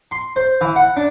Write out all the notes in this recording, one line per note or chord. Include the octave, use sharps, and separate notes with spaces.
C6
C5
E3
F#5
D4